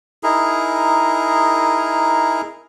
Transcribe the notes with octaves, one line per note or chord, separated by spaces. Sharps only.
D#4 E4 G#4 A#4